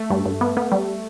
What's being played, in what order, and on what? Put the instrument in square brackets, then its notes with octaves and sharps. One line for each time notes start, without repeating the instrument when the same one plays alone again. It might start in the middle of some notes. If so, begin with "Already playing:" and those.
Already playing: [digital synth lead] A3
[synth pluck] G2
G2
B3
B3
G3